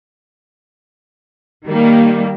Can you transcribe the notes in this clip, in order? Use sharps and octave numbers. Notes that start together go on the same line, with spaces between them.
D#3 G3 A#3